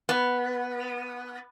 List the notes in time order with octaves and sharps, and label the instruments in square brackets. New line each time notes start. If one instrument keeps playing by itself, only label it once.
[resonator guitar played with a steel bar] B3